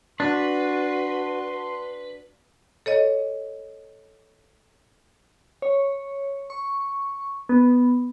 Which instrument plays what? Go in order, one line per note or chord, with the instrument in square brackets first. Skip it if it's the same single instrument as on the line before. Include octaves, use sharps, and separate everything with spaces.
[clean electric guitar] D4 [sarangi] F#4 [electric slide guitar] B4 [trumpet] C6
[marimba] A4 C#5 D#5
[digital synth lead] C#5
C#6
B3